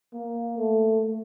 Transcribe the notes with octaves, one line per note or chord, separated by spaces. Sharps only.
A#3
A3